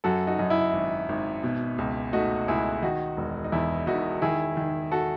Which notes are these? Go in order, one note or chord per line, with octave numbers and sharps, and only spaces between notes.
F#2 F#4 A4
D#4 F#4
F#2 D#4
E4
G#1
G#1
B2
C#2
A3 D#4 F#4
C#2 E4 G#4
D#3 D#4 F#4
E1
D#4
E2 E4
E1 D#4 F#4
D#3 E4 G#4
D#3
F#4 A4